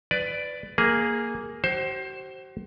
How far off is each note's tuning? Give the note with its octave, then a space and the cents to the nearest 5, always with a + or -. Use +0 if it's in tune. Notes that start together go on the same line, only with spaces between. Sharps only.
B4 +20 D5 +0
A#3 +0 G#4 +0
F#4 +45 C5 +20